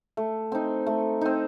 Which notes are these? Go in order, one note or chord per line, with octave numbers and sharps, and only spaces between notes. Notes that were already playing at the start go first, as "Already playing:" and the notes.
A3
C4 D#4
A3
C4 D#4